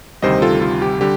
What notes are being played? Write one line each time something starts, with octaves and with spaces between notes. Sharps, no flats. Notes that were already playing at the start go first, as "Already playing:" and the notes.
D2 C3 D#3 G3 C5 D#5
F4 A4
F4
G4
D3 G3 G4